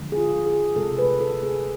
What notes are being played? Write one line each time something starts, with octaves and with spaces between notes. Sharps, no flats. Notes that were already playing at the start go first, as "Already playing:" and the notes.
Already playing: D3 F3 G#3
G#4
F4
G#4
C3 G#3 A4
B4
A4
G#4